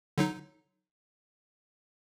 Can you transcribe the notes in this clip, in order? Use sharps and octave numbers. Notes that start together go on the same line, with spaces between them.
D3 F#3 D#4